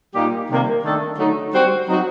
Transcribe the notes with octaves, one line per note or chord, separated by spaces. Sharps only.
A#2 G3 A#3 D#4 G4
C3 D#3 G3 A#3 D#4
D#3 A3 D4 A4
D3 F#3 A3 D#4
G3 C4 F#4 C5
F#3 C4 D#4 F#4